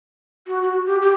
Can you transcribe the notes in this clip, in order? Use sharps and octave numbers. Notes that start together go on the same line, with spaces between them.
F#4
F#4
G4
G4